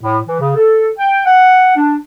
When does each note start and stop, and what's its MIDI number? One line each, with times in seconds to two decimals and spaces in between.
0.02 0.18 45
0.26 0.37 52
0.40 0.55 49
0.56 0.88 69
0.98 1.25 79
1.25 1.72 78
1.75 1.96 62